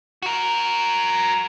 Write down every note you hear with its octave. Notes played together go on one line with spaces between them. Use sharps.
F#4 A#4